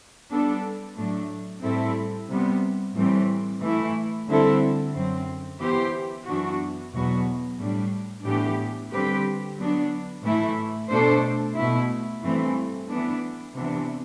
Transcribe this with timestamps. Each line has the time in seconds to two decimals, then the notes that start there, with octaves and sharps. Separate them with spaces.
0.30 G3 B3 D4 A4
0.96 A2 F#3 A3 D4
1.63 A2 G3 C4 E4 A4
2.29 C3 G3 B3
2.95 A2 E3 G3 C4
3.61 E3 A3 E4
4.27 D3 G3 C4 E4 A4
4.94 F#2 F#3 C4
5.60 E3 B3 E4 G4 C5
6.26 F#2 E3 B3 D4 F#4
6.93 E2 B2 F#3 B3 F#4
7.58 A2 G3 D4
8.25 A2 E3 B3 D4 G4
8.91 D3 G3 C4 G4 B4
9.58 F#3 B3 D4
10.24 A2 E3 A3 E4
10.90 B2 A3 D4 A4 C5
11.56 B2 A3 E4
12.23 G2 E3 A3 C4
12.88 E3 B3 D4
13.55 C3 E3 B3 D4